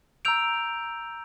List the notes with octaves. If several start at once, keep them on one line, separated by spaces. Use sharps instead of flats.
A#5 E6 G6 D7 F7